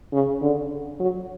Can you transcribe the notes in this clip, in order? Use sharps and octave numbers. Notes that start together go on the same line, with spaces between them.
C#3
D3
F#3